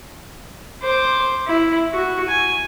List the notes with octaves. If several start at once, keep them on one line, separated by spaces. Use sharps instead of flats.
C5 D6
E4
F#4
G#5